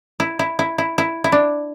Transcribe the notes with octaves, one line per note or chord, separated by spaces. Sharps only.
E4
E4
E4
E4
E4
E4
D4